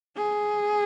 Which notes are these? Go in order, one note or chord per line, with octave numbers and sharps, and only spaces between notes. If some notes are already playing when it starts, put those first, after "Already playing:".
G#4